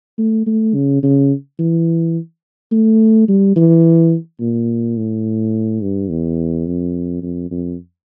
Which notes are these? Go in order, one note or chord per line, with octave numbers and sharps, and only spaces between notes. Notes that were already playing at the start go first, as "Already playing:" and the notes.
A3
A3
C#3
C#3
E3
A3
G3
E3
A#2
A2
G2
E2
F2
F2
F2